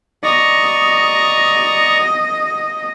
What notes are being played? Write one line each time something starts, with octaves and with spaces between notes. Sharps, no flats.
D5 D#5 A#5 C#6